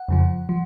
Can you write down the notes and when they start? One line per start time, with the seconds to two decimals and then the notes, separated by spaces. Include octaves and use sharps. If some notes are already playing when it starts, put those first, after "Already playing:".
Already playing: F#5
0.09 F2 C#3 F3
0.49 F3